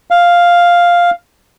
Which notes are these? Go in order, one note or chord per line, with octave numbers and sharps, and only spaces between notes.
F5